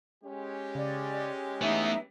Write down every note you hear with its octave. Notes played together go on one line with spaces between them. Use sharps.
G#3 C#4 G4
C#3 D5
E3 A3 B3 D#4 E5